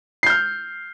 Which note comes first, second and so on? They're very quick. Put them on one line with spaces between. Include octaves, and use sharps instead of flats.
C7 G6 F6